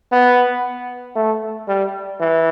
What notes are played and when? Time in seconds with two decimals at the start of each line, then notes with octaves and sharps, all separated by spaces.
0.12 B3
1.16 A3
1.68 G3
2.20 E3